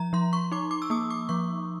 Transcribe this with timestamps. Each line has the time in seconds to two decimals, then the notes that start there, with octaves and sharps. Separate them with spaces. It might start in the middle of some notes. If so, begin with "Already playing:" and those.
Already playing: F3 A#5
0.13 F3 C6
0.33 C#6
0.52 D#4 D6
0.71 D6
0.82 E6
0.90 A#3 D#6
1.10 D6
1.29 F3 C#6